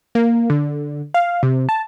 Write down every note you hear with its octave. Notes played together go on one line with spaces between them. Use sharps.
A#3
D3
F5
C3
A5